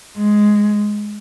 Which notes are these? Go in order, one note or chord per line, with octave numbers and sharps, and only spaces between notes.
G#3